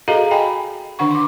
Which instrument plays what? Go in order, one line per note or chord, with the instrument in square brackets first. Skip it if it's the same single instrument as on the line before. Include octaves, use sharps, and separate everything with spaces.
[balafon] F#4 G#4 A4 D#5 F5 A#5
D#5 G5 G#5 B5
D3 D#3 D4 F#5 C#6
C6 D6